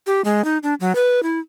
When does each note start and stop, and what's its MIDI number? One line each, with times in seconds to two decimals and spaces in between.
0.07 0.21 67
0.25 0.44 56
0.44 0.58 63
0.63 0.74 62
0.80 0.95 54
0.95 1.23 71
1.23 1.39 64